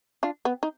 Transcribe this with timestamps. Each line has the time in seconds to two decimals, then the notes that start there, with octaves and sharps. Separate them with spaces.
0.23 D4 F4
0.45 B3
0.63 D#4